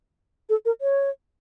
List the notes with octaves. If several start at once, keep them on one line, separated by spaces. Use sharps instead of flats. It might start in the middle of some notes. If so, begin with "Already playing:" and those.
A4
A#4
C#5